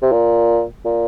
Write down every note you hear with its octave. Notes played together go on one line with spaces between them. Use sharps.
C3
A#2
A#2